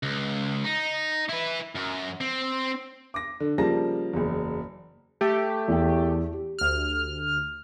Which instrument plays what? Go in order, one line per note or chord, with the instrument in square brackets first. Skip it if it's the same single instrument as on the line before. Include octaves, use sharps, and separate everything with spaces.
[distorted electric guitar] C#2
D#4
E4 B4
F#2
C4
[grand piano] D6 A#6
D3
C#3 F3 G3 A#3 A5 A#6
F#1 E2
[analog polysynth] A3 G4
[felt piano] E2 G5
G4
[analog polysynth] D2 F6